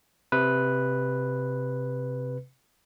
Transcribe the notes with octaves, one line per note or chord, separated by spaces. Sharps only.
C3 B4